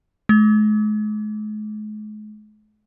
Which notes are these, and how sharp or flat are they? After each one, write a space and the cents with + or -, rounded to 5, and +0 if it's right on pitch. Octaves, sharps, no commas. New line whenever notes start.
G#3 +45